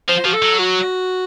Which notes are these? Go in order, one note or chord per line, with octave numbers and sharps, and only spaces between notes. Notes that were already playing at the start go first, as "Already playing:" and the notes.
F3 C5
F3 F#4
A4
F#3
F#4